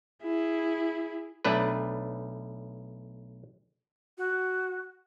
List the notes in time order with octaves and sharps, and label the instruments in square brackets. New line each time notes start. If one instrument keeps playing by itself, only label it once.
[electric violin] E4 G#4
[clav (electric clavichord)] B1 A3 D4 B4
[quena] F#4